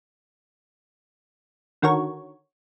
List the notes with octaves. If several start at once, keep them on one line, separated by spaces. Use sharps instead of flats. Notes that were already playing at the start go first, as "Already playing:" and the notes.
D3 D#3 F#4 A#4 C#5